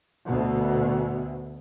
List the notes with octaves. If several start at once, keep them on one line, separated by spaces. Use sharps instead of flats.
D2 B2